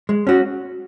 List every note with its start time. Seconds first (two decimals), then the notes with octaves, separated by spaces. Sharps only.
0.09 G#3
0.27 C#4 F#4